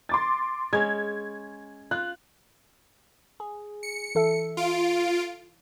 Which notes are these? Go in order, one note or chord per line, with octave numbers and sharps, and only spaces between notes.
C6 D6 A6
G#3 C#4 G#6
F4 F#6
G#4
C#7
E3 A4 E5
F4 D7